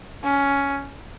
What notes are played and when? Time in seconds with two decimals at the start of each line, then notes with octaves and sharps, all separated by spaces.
0.24 C#4